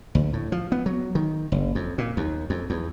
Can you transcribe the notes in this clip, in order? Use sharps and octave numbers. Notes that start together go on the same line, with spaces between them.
D2
A2
F3
B3
F#3
D#3
F#1
F2
A#2
D#2
F2
E2